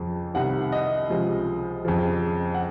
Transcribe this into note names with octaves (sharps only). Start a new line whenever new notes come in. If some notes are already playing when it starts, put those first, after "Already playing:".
Already playing: F2 C#3 F3
C2 C3 D#3 F#5
D#5
C#2 C3 F3
F2 C#3 F3
F#5